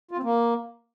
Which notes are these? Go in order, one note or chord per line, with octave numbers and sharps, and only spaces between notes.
F4
C4
A#3